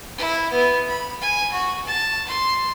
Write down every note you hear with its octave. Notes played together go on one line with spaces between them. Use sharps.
E4
B3
B5
G#5
F#4
A5
C6